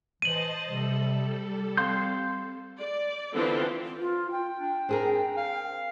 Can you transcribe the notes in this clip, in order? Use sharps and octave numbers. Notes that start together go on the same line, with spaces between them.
E3 C5 D#5 A5 D#7 F#7
C3 G3 A4
C4 F5 C6 G6
D5
D3 E3 B3 C4 F4 A4
F4
G5
D4
C4 D4 G#4 A#4
F5